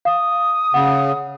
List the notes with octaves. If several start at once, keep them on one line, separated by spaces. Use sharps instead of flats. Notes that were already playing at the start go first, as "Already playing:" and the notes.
F5 D#6
C#3 F#5